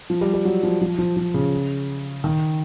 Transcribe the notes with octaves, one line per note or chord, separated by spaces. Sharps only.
F3
G3
G3
F#3
F3
F3
F3
F3
C#3
D#3